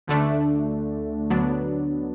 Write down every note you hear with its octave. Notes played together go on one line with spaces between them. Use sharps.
D2 D3 A3 D4
D2 D3 F#3 B3 D4